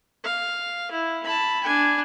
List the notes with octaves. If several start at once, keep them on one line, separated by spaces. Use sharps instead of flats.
F5
E4
A5 B5
D4 G#5